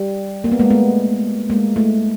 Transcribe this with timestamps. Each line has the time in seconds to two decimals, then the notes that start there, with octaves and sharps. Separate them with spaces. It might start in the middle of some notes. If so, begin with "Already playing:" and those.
Already playing: G3
0.44 A#3
0.52 B3
0.59 G#3 A#3
0.70 A3 B3
1.50 G#3 A#3
1.76 A3